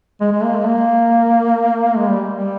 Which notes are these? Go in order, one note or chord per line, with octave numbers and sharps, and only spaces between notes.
G#3
G#3
A#3
G#3
A#3
G#3
G3
G3